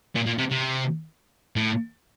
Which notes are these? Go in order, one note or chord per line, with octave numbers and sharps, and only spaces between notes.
A#2
A#2
C3
C3
A2